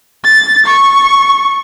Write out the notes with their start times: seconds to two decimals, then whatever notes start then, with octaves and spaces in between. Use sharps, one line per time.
0.25 A6
0.66 C#6